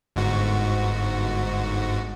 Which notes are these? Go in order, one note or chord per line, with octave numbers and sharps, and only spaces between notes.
G1 G#2 F#4